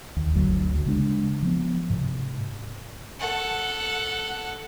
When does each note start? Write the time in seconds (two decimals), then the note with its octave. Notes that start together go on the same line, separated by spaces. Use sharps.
0.17 D#2
0.35 G1 D2 F#3
0.86 C#3 G#3 C4 D4
1.43 F3 B3
1.90 G#2 C3
3.19 A4 F#5